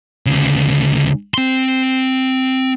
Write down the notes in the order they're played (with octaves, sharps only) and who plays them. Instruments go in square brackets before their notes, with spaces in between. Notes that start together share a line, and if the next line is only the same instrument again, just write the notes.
[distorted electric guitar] D2 C#3
C4 C6